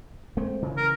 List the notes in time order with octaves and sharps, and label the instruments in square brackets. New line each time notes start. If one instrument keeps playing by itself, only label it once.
[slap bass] G#3 A3 C4
C#3 E3
[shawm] A#4